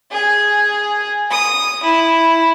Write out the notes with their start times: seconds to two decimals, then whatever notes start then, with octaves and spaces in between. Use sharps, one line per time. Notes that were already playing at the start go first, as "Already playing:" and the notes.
0.12 G#4
1.31 D#6
1.84 E4